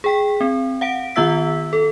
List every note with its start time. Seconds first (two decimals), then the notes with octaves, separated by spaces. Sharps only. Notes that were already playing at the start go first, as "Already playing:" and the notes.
0.04 G#4 G5 B6
0.41 C4
0.81 F5 F#5 D7
1.16 D#3 B3 F4 E5 E6 B6
1.73 A4